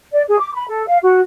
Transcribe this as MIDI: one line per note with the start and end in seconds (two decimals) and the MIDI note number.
0.13 0.23 74
0.28 0.39 68
0.40 0.53 86
0.54 0.65 83
0.68 0.86 69
0.88 0.98 77
1.03 1.21 66